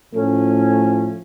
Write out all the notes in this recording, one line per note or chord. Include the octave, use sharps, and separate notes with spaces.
A2 F3 A3 C#4